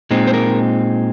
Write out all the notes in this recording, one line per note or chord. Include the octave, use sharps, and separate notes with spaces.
A#2 G#3 C4 D#4
C5
A#4